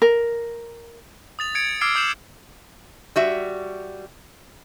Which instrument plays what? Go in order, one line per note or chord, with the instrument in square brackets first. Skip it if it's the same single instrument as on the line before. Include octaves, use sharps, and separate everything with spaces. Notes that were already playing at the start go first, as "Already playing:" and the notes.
[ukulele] A#4
[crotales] D#6 A6 F7
G#6 C#7 D7
D6 E6 F6 G#6 C7 D7
D#6 G6 C7 E7 F#7
[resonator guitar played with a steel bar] G3 F#4 E5